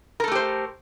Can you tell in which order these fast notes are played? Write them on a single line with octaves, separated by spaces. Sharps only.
A#4 A4 A3 G4 C5